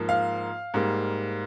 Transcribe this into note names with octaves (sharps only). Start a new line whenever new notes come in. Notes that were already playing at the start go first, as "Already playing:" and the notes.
Already playing: G#2 F3 A#3
F5
G#2 G3 A#3